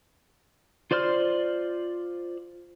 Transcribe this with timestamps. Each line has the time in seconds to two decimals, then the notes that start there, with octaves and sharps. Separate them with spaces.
0.91 F4 C5 D5 C6 F6